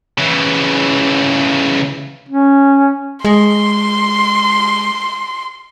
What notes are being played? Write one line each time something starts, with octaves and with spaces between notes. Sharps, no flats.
C#3 E3
C#4
G#3 C6